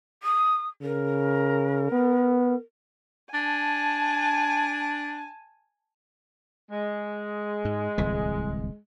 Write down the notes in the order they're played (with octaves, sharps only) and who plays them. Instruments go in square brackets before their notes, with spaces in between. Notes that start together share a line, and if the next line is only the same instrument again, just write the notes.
[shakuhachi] D#6
[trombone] C#3 [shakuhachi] A#4
[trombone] B3
[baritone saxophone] D4 [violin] G#5 A5
[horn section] G#3
[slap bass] G#2
D1 C2 E3